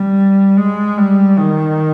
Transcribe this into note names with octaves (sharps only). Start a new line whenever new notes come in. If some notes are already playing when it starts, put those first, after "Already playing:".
Already playing: G3
G#3
G3
D#3